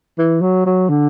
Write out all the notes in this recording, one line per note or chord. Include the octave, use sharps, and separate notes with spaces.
E3
F#3
F#3
D3